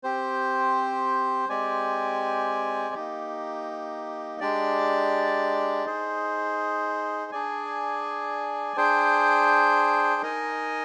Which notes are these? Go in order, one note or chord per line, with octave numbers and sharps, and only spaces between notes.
C4 G4 C5
G#3 C4 G4 D5 G#5
A#3 D#4 G4
G#3 D4 G4 D5
D#4 G#4 C5
D4 G#4 D5 G#5
D4 G#4 C5 G5
D#4 A#4 D#5 G#5